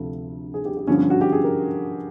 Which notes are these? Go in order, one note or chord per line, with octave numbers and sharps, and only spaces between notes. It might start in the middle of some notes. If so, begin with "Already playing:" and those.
Already playing: D2 C3 F3 A4
G#4
G4
G4
G2 D3 F3 C#4
C#4
F#4
G4
G#4
A#4